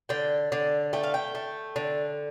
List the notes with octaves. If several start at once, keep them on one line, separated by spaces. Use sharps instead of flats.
D3 G5
D3
A3 G5
F5
G5
A3
D3